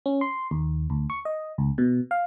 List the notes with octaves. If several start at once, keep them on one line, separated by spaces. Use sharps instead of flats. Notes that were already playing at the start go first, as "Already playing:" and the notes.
C#4
C6
D#2
D2
C#6
D#5
C#2
B2
F5